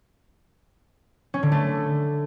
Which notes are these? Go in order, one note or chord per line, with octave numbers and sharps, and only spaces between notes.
C#4
D3
A3